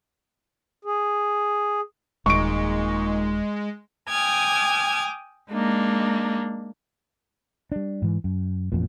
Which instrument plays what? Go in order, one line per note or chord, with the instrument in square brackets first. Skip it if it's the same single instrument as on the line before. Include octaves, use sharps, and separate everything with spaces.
[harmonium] G#4
[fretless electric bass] D#1 [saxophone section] A#2 D#4 [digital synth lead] G#3 [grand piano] C#6 D7
[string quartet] G5 G#5 D6 D#6 F6 G#6
G#3 A#3 D4 D#4
[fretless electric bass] G3 D4
G#2 E3
F#2
A1 F2 A#2